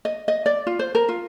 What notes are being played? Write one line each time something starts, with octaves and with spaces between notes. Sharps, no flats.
D#5
D#5
D5
F4
C5
A#4
F4